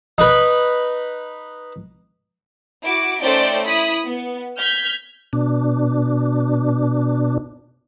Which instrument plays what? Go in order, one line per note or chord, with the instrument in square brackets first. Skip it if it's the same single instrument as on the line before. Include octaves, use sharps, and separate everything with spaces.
[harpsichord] D#4 B4
[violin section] E4 F#4 D6 D7
A3 C#4 D#4 C5 D5 G5
E4 B5 D#6
B3
F6 G6 G#6 B6
[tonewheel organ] B2 D4